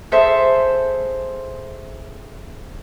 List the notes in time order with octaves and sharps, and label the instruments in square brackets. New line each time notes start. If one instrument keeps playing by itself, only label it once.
[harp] G#4 A4 C5 E5